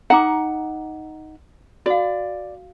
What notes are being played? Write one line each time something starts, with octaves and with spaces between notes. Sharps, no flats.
D#4 F#5 A#5 D6
F#4 D5 F5